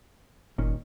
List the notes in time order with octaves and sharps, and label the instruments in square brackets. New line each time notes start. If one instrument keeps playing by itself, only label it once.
[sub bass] F#1 [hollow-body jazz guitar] A#2 D#3 C#4